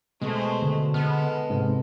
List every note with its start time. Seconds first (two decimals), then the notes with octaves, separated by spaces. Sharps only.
0.21 B2 G#3 A3 C5
0.62 D3
0.94 G#3 B3 A4 F6
1.49 G#2 C3